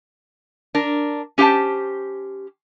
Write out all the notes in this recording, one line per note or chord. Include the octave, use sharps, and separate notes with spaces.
D4 A#4
C#4 G4 C5 F5 G5 A5